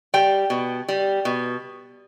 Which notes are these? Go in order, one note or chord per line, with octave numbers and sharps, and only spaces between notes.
G3 G5
B2
G3
B2